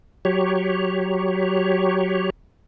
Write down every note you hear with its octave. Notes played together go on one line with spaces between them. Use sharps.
F#3 G4 C#5